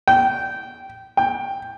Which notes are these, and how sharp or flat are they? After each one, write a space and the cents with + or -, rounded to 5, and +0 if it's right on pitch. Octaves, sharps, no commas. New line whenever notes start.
G5 -15
G5 +10